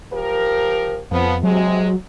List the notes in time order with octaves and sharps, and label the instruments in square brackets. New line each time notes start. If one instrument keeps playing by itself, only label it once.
[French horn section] F3 G4 A#4
[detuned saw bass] F2 [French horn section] F3 B3
[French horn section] C3 G#3 [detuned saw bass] F#3